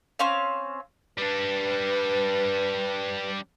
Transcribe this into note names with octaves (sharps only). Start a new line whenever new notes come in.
C4 C#4 F5
G3 D4 B4